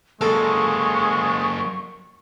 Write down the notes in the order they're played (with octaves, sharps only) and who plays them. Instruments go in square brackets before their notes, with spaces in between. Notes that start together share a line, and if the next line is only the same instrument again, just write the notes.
[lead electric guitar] F#3 A#3 [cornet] G#3 [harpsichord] A4 [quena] C#6